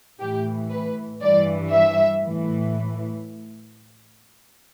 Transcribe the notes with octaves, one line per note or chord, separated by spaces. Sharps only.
A2 E3 G4
B4
G2 E3 D5
E5
A2 E3